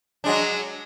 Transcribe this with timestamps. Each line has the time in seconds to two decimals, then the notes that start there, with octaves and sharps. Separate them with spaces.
0.24 F#3 G#3 D4